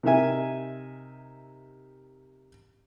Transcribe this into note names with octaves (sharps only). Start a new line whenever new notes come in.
C3 D#4 A#4 E5 G#5